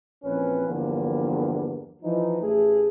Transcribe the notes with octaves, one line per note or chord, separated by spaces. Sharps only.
A#1 E3 C4 C#4 A#4 B4
E2 G2 D3 F3 A#3
E3 F3 D#4
A1 A3 G#4